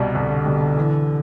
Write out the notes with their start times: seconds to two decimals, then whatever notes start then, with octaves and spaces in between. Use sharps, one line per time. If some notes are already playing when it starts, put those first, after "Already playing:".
Already playing: C2 B2 G3
0.15 C2 D3
0.46 B2 G3
0.77 E3